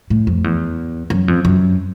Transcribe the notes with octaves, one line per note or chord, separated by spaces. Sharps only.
A2
F2
E2
F#2
F2
F#2